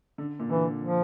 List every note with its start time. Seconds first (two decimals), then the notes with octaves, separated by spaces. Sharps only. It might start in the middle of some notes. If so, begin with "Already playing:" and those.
0.18 D3
0.39 A#2
0.49 D3 E3
0.81 F3